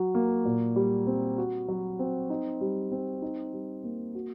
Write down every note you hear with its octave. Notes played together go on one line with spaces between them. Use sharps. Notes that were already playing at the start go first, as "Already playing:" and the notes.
Already playing: F#3 F#4
A#3
A#2
G3
C4
F#4
F#3
C4
D#4
G3
C4
D#4
G3
A#3
F#4